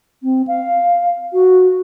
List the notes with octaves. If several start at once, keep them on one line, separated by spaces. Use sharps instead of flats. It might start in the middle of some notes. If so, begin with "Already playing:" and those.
C4
F5
F#4